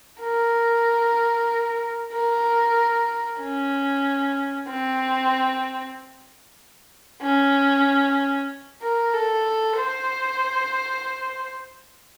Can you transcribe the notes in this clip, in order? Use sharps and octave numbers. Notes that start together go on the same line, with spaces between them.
A#4
A#4
C#4
C4
C#4
A#4
A4
C5